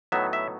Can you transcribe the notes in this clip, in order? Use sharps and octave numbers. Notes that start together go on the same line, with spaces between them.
A2 F#3 B3 D#4 E5
E5